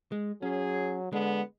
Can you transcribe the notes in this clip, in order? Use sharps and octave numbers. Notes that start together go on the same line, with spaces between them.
G#3
F#3 C#4 G#4
D3 G#3 B3